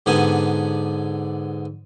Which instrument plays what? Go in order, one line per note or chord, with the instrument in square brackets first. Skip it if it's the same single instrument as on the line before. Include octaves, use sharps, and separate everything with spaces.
[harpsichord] G#2 D3 B3 G4 G#5